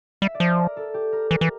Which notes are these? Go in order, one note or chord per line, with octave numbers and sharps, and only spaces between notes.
G3 E5
D5
F3
A#4
A4
G4
A#4
E3 A#4
E3